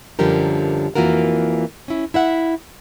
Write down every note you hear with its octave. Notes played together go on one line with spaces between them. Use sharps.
F#2 D3 F3 G3 G4 A#4
F2 E3 A#3 F4 F#4 A#4
C#4 E4
E4 E5 F#5